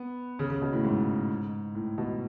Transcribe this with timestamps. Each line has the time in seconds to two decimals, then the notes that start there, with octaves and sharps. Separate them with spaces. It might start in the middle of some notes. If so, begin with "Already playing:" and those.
Already playing: B3
0.39 C#3
0.50 C#3
0.62 B2
0.73 A2
0.85 G#2
1.75 A2
1.98 B2